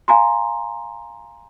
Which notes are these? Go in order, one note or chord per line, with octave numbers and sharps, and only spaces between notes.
F5 G#5 A#5 C6